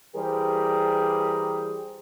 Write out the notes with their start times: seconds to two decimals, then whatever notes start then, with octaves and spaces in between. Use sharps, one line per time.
0.16 E3 G3 G4 G#4 A#4 C5